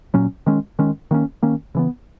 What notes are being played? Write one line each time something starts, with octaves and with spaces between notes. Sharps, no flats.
A#2 F#3 C#4
D#3 G#3 C#4
D#3 G#3 C#4
D#3 A#3 C#4
D#3 A#3 C#4
C#3 E3 B3